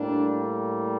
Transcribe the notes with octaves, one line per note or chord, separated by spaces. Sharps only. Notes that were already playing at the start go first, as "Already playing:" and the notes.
Already playing: A2 G3 A#3 D4